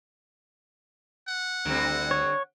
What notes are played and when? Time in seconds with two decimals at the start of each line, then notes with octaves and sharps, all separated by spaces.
1.28 F#5
1.65 D2 D3 G3 C4
2.11 C#5